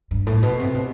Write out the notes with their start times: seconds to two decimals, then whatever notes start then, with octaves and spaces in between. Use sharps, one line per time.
0.11 G2
0.27 A2
0.43 B2
0.59 C3
0.74 B2